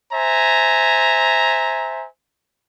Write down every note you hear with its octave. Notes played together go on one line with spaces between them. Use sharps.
C5 E5 G#5 A#5